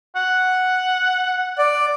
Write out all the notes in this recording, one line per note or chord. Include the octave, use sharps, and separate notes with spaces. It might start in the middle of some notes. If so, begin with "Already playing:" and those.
F#5
D5